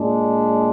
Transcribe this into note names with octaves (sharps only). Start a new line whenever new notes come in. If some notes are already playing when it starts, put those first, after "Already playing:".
Already playing: A#2 G#3 D4